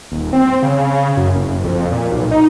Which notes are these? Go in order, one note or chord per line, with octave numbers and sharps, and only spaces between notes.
D#1
C4
C#3
F#2
F#1
F2
A#2
B1
D#4